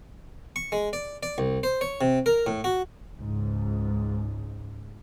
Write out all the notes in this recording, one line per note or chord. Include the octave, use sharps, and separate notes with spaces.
C#6
G#3
D5
D5
C2
C5
C#5
C3
A#4
A2
F#4
C#2 G#2